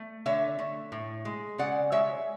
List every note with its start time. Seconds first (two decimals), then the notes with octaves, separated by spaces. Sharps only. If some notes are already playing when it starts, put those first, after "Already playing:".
Already playing: A3
0.26 D3 C#5 E5
0.59 A3
0.92 A2
1.25 G#3
1.58 C#3 D5 F#5
1.92 G#3 C#5 E5